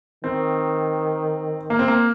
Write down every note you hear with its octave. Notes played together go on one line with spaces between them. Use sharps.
D#3 C4
A#3
C4
A#3